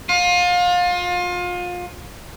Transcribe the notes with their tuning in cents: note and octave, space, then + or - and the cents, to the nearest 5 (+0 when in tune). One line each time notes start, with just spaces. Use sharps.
F4 +30